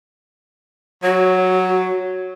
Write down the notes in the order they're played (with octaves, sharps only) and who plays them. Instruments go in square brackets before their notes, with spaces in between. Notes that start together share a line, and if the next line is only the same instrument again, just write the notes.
[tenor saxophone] F#3 [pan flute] F#4